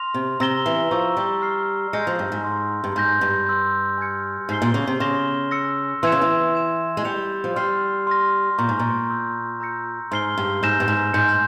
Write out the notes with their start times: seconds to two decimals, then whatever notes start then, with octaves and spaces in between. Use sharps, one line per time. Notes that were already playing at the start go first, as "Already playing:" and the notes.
Already playing: C6 F6 A#6 F7
0.14 C3
0.40 C3 A#5 E6 A#6 E7 G7
0.66 E3
0.91 F3 A#5 C#6 E6
1.17 G3
1.42 C#6 F6 C7
1.93 G#3 C6 E6 G6 A#6 C#7
2.07 F3
2.19 G2
2.32 G#2
2.44 C6 E6 A#6
2.84 G2
2.95 G#2 C6 G6 A#6
3.21 G2
3.47 C6 E6 G6
3.98 G#5 C6 F6 G#6 C#7
4.49 G#2 C6 G6 C7 G7
4.62 A#2
4.74 C#3
4.87 C3
5.00 C#3 C6 F6 A#6 E7 G7
5.51 E6 A#6 C#7
6.03 E3 C6 E6 G#6 C#7 E7
6.12 C#3
6.22 E3
6.54 E6 G#6 E7
6.97 G#3
7.05 G3 G6 C#7 F7
7.44 F3
7.56 G3 C6 F6 C7
8.07 C6 F6 A#6
8.58 A#2 A#5 C#6 G6
8.69 G#2
8.79 A#2
9.09 C6 E6 G6
9.60 A#5 E6 G6 A#6 C#7
10.11 G#2 C6 F6 C7 G7
10.38 G2
10.63 G#2 E6 G6 A#6 E7
10.80 G2
10.88 G#2
11.13 G#2 G#5 C6 G6 C#7